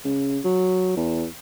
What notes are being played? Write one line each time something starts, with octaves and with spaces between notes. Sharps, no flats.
C#3
F#3
E2